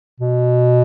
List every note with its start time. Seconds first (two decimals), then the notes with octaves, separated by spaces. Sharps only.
0.20 B2